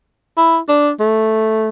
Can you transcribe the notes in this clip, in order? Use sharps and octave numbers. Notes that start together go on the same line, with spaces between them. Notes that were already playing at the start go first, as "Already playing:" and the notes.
E4
D4
A3